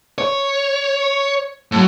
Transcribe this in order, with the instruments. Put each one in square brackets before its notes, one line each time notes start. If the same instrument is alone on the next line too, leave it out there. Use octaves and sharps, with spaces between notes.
[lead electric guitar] C#5
A2 F#3